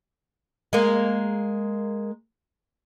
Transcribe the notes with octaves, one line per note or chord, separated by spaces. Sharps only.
G#3 A#3